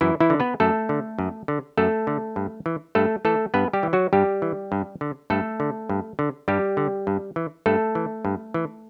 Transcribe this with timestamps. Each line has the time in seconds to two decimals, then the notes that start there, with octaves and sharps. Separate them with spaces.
0.01 F#2 E3 E4
0.20 E3 E4
0.30 D3
0.40 B3 B4
0.60 F#2 A3 A4
0.89 D3
1.19 F#2
1.48 D3
1.77 F#2 A3 A4
2.07 D3
2.36 G2
2.66 E3
2.95 G2 A3 A4
3.25 E3 A3 A4
3.54 G2 B3 B4
3.73 G3 G4
3.83 E3
3.93 F#3 F#4
4.13 G2 G3 G4
4.42 E3
4.72 G2
5.01 D3
5.30 G2 A3 A4
5.60 D3
5.90 G2
6.19 D3
6.48 G2 G3 G4
6.77 D3
7.07 G2
7.36 E3
7.66 G2 A3 A4
7.95 E3
8.25 G2
8.54 E3